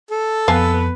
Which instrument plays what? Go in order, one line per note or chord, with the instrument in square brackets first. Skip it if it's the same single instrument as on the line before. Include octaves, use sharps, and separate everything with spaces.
[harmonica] A4
[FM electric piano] F2 [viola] B3 B4 [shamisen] F5 G#5 A5